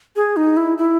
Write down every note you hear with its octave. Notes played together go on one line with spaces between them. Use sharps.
G#4
D#4
E4
E4